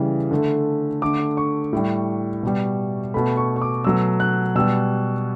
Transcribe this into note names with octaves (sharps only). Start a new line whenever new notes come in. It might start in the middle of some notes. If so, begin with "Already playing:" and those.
Already playing: C#3 E3 G3
D3 A3
D3 A3 D6
C#6
A2 G3
B2 G3
B2 A3 B5
C#6
C#6
D6
B2 F#3 A3 E6
F#6
B2 G3 E6